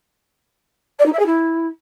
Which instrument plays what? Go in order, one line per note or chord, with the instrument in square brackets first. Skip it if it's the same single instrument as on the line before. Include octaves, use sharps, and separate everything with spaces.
[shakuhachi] D5
D#4
E5
G#4
E4